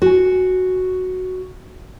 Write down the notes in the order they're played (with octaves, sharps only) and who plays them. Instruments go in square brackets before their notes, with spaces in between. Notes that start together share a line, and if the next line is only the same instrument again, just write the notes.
[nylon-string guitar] F#4 G#5